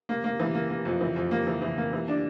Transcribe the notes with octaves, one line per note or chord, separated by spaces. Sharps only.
A#3
A#3
E3
A#3
A#3
F2
E3
F2
A#3
E3
E3
A#3
E3
D4